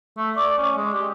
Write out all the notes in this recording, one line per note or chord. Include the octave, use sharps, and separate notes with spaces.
A3
D5
C#4
G#3
G4